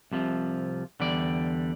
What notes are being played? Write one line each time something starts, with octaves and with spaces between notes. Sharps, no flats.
C2 C3 F3
E2 D3 G3 D5